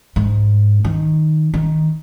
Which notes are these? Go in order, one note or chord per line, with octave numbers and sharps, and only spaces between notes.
G#2
D#3
D#3